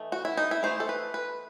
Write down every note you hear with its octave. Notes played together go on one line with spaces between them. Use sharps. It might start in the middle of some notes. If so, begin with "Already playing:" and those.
Already playing: E3 A3 D#4
F#4
E4
D#4
E4
E3 A3 D#4 C5
A4
B4
B4